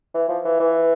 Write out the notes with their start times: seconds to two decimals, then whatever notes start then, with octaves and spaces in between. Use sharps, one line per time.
0.14 E3
0.29 F3
0.45 E3
0.60 E3